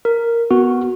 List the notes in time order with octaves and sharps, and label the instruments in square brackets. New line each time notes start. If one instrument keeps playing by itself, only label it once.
[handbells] A#4
[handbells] B3 [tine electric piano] F#4